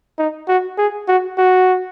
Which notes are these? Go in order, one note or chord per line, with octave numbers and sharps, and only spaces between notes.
D#4
F#4
G#4
F#4
F#4